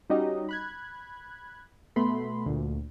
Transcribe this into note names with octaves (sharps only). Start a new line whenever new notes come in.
G3 C#4 D#4 F#4 G4 D#5
B5 F#6 G#6
B2 A3 B3 B5 C6
D2 A#2